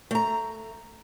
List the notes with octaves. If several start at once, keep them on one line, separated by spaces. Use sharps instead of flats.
A3 A#5